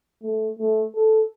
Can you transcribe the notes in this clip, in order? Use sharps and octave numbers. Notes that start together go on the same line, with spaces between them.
A3
A3
A4